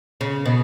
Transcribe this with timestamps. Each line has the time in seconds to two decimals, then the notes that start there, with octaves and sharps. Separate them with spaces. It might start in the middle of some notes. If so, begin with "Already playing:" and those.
0.21 C#3
0.46 B2